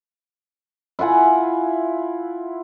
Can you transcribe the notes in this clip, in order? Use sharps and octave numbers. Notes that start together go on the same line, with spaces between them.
E4 F4 F#5 G#5